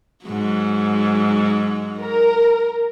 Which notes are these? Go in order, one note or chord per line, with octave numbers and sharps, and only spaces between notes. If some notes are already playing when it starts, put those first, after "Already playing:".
G#2 F#3
A#4